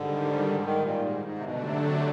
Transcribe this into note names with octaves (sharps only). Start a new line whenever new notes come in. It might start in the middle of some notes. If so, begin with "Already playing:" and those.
Already playing: G#2 D3 D#3 G3
D#3
A#2
G#2
G#2
C3
B2 D3 F#3 A3 D4
C3
C3